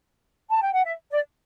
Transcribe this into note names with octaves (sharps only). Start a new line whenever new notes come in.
A5
G5
F#5
E5
D5